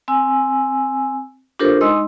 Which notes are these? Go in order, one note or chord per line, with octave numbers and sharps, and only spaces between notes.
C4 G#5 E6
D4 F4 G4 A4 A#4 C5
G#3 D#4 D#5 C6 E6